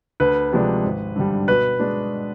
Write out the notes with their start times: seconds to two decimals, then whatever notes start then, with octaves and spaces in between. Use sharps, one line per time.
0.20 D2 B4
0.52 C3 F3 G#3 D4
0.84 G#1
1.16 G2 D3 G3
1.48 B2 B4
1.79 G#3 D4